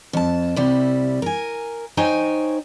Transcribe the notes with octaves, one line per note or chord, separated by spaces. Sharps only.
F2 A5
C3 G3 E4
A#4 G#5
D#4 C5 C#5 G5 G#5